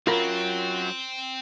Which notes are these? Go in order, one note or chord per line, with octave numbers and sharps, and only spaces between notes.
F#2 F#3 C4 F4 A#4 B5